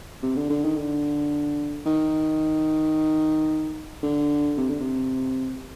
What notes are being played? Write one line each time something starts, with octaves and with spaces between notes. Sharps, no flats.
C3
D3
D3
D#3
D3
D#3
D3
C3
D3
C3